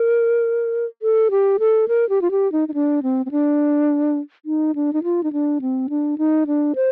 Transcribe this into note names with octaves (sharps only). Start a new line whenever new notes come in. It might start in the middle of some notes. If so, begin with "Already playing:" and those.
Already playing: A#4
A4
G4
A4
A#4
G4
F4
G4
D#4
D#4
D4
C4
C4
D4
D#4
D4
D#4
F4
D#4
D4
C4
D4
D#4
D4
C5